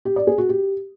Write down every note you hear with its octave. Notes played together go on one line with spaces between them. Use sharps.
G4
D5
G#4
F#4
G4